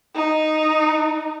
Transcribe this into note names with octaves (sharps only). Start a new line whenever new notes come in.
D#4